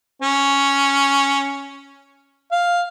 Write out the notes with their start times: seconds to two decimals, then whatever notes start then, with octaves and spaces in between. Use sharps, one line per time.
0.22 C#4
2.52 F5